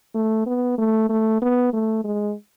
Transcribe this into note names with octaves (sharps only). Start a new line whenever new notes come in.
A3
B3
A3
A3
B3
A3
G#3